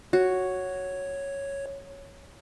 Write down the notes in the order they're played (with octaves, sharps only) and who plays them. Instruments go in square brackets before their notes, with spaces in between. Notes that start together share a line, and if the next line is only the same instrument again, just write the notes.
[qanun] F#4 [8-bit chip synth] C#5